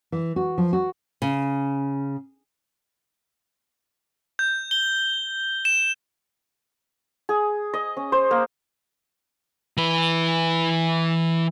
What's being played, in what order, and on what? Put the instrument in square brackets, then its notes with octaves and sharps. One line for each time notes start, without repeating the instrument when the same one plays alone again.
[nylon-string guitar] E3
F#4
F3
F#4
C#3
[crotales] G6
G7
E7
[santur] G#4
D#5
C#4
C5
A#3
[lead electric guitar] E3 B4